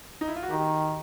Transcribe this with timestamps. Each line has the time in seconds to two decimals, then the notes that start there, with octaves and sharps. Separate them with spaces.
0.21 D#4
0.28 E4
0.36 F4
0.43 F#4
0.50 D#3 G4